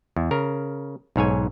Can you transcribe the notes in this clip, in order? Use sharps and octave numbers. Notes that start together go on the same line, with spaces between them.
E2
C#3 A#4
B1 G#2 C#5 G#5